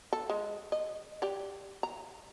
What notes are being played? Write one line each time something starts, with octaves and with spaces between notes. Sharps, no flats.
A4
G#3
D#5
G4 D5
A#5